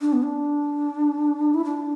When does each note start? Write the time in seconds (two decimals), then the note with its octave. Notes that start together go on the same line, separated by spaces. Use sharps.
0.01 D4
0.13 B3
0.24 D4
1.54 E4
1.65 D4